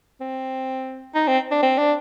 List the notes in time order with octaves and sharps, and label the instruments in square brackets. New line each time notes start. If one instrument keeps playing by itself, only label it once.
[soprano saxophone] C4
D#4
C4
D4
C4
D4